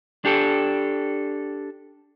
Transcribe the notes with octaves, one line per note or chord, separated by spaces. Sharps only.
D4 G4 A4